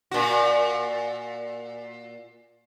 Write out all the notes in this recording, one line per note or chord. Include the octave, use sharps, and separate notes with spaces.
A#2 F#4